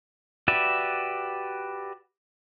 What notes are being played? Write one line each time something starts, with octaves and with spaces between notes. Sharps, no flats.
F#4 G4 B4 D5 E5